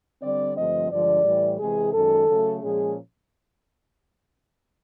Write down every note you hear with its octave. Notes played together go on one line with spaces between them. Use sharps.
D3 G3 C4 D5
G2 D3 F3 A3 C4 D#5
G2 D3 F3 G#3 D5
A2 E3 G3
C3 E3 G#3 G#4
F#2 D#3 G#3 A4
C#3 F#3 A3
A#2 F3 G#3 C#4 G#4